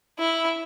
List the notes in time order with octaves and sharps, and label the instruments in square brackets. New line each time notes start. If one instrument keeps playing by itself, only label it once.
[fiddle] E4